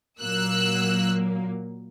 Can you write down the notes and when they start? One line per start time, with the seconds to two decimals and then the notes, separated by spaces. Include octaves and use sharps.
0.20 A#2 F#3 A#3 E6 F#6